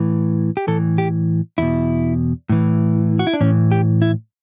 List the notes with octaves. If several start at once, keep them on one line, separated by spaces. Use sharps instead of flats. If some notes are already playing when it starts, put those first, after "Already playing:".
Already playing: A2 E3
G4
A2 E3 A4
G4
E2 B2 E4
A2 E3
F#4
E4
D4
A2 E3 C#4
G4
E4